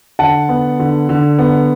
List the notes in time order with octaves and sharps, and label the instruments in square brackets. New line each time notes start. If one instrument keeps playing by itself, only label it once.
[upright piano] D3 F#5 A5
B3
D3
D3
B3